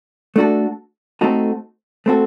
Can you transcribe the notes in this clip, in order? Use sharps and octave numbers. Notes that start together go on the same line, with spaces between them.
A3 D4 F#4 A4
A3 C4 D#4 F#4 A4
A3 C4 D#4 F#4 A4